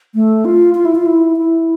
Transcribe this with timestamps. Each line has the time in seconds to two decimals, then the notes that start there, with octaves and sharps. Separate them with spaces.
0.15 A3
0.45 F4
0.75 F4
0.85 E4
0.95 F4
1.06 E4
1.37 E4